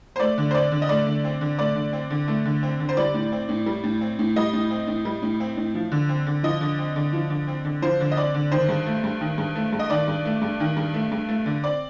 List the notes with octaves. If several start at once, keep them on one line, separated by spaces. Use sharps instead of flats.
C5
A3 D5
D3
C5
C4 D5
D3
D#5
A3 D5
D3
C4
D3
A3 D5
D3
C4
D3
A3
D3
C4
D3
C5
G3 D5
A2
C4
A2
G3
A2
C4
A2
G3 D#5
A2
C4
A2
G3
A2
C4
A2
F3
D3
C4
D3
F3 D#5
D3
C4
D3
F3
D3
C4
D3
F3 C5
D3
D#5
C4 D5
D3
D#3 C5
G2
A3
G2
D#3
G2
A3
G2
D#5
D#3 D5
G2
A3
G2
D#3
G2
A3
G2
A3
D3
C4 D5